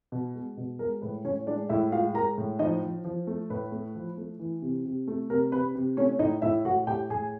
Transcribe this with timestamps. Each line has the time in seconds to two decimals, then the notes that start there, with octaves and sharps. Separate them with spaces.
0.12 B2
0.35 G#3
0.57 B2
0.79 G#3 A#4
1.02 A2 B4
1.25 A2 C#4 C#5
1.46 G#3 D4 D5
1.69 A2 E4 E5
1.92 G#3 F4 F5
2.14 G#3 A#4 A#5
2.38 A2
2.59 F3 D#4 D#5
2.82 F3
3.04 F3
3.27 A3
3.50 A2 B4
3.72 A3
3.95 F3
4.17 A3
4.39 E3
4.62 C3
4.85 C3
5.08 A3
5.30 C3 A#4
5.52 C3 B4
5.75 C3
5.97 A3 C#4 C#5
6.19 A2 D#4 D#5
6.42 A2 E4 E5
6.65 A2 F#4 F#5
6.87 A2 G4 G5
7.10 A2 G#4 G#5